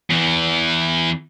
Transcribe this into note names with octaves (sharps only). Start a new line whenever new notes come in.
E2 E3